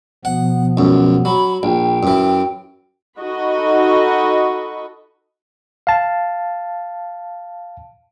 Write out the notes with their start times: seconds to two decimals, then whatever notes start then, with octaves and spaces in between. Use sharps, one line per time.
0.25 B2 F3 B3 F#5
0.77 C#2 F#2
1.25 F#3 B5
1.63 A#1 G5
2.03 F#2 E3
3.21 D#4 F#4 A4 D#5 B5 C#6
5.87 F5 A5